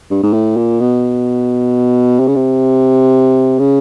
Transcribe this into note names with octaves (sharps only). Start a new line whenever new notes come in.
G2
G#2
A2
A#2
B2
C3
C#3
C3
C#3